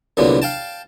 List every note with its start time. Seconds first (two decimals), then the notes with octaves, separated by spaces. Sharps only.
0.17 C2 A#2 D3 F#3 B3
0.42 F5 G5 A5